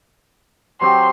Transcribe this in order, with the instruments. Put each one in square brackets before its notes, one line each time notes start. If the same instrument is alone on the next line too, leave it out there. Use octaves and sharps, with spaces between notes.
[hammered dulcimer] F#3 C4 G4 [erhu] C6